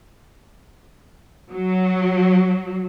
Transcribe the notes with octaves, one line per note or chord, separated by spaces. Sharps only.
F#3